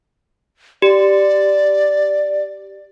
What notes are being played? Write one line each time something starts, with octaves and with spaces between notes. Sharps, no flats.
G4 D5